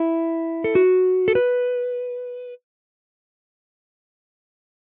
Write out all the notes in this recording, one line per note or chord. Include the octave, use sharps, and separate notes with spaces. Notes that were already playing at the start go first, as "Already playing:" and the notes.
Already playing: E4
A4
F#4
A4
B4